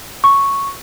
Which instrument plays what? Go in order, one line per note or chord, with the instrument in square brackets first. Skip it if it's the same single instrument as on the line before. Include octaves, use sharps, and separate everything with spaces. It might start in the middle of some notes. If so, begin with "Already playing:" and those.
[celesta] C#6